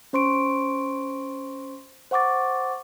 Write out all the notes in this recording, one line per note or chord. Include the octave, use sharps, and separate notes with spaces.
C#4 C5 C6 C#6 D7
C5 F#5 C#6 D6 A6